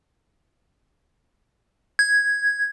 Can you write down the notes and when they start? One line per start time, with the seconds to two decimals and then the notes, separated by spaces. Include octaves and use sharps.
1.99 G#6